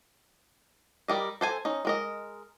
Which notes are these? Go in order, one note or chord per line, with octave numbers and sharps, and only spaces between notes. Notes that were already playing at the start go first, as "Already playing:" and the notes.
G3 A#4 D#5
A4 C5 G#5
C#4 D#4
G#3 A#4 D#5